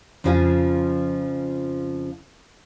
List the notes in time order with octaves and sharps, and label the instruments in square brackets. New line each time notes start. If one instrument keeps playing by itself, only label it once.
[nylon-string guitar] F2 C#3 F3 F4 G#4 F5